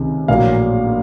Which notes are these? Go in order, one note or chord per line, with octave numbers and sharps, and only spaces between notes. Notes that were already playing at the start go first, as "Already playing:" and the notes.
Already playing: C#2 C3 D#3
A#1 A2 F#3 A#3 F5